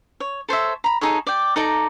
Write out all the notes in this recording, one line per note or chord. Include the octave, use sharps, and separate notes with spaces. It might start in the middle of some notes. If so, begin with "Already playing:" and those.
C#5
A4 C5 C#5 E5
A#5 B5
D#4 G#4 A4 C#5
D5 G5
D#4 A4 D5 A#5